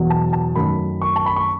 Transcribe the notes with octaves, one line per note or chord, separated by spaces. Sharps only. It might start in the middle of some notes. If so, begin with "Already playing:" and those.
Already playing: E2 B2 F#3
A5
A5
F#2 D#3 A3 C#4 B5
C#6
A5
B5
C#6